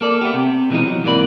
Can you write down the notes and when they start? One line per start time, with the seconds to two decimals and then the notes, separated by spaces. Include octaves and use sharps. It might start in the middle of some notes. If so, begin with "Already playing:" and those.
0.01 A#3 A4 D5
0.21 A3 B3 G4
0.34 C3
0.70 B2 E3 F3 G#3 C4 D#4
0.87 F#3
1.04 G#2 C3 E3 A#3 D5 B5